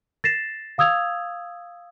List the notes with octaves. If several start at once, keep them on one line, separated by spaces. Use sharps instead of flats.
A6 A#6 C7 E7
F5 D#6 E6 G#6 F7